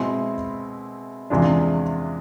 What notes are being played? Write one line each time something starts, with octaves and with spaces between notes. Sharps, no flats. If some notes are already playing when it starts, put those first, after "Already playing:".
Already playing: B2 G#3 C4 E4
E2 C3 G#3 D4 F4